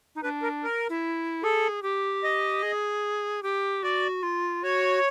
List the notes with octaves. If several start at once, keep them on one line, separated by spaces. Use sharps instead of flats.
D#4
D4 B4
A#4
A#4
E4
G#4 A4
G4
D#5
G#4
G4
F#4 D5
F4
F#4 C#5